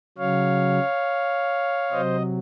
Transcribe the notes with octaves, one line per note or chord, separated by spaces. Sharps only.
C#3 F#3 C#5 F5
C3 F#3 C5 D#5